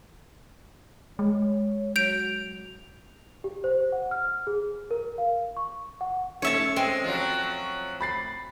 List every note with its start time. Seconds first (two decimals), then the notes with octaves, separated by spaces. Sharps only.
1.19 G#3 C#5
1.96 F#3 G6 D7 F7
3.44 G4
3.64 C5
3.92 F#5
4.11 F6
4.47 G#4
4.91 A#4
5.18 F5
5.57 C#6
6.01 F#5
6.42 A3 C#4 C#5 E5 A5
6.76 G#3 C4
7.04 F3 F#3
8.01 B5 A6 C7